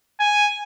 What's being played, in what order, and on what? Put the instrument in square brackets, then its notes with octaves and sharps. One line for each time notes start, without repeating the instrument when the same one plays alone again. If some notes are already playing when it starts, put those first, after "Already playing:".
[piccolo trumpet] G#5